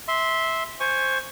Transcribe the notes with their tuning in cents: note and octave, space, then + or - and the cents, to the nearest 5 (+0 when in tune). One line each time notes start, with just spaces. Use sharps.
E5 -15 C6 +0
C5 +10 G#5 +0 C#6 +0